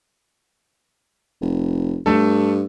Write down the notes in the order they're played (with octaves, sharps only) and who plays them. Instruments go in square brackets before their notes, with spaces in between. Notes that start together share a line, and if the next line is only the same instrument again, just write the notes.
[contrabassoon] F1
[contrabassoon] G2 [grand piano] A3 A4